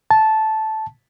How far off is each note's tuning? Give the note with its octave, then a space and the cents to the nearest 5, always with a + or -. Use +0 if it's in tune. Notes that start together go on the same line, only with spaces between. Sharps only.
A5 -10